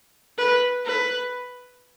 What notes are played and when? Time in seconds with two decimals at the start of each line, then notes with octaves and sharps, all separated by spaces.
0.38 B4
0.86 B4